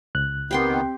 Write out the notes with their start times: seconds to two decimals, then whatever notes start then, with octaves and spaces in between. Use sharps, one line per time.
0.15 C#2 F#6
0.51 D#3 B3 C4 G4 G5 C6